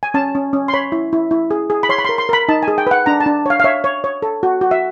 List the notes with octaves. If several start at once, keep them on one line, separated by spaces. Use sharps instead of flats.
G#5
C#4 A5
C#4
C#4
C6
C#5 B5
E4
E4
E4
G#4
G#4
B5
C#5 C6
B5
A#4 C6
C6
A#4 B5
D#4 A5
G#5
G#4
G5
B4 F#5
D4 A#5
A5
D4
C#5 F5
F5
C#5 E5
C#5
C#5
A4
F#4
F#4
E5